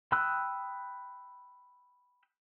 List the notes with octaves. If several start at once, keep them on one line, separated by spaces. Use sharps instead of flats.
G5 B5 D#6 E6 F#6